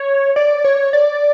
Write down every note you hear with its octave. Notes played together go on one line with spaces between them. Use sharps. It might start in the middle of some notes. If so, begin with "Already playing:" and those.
Already playing: C#5
D5
C#5
D5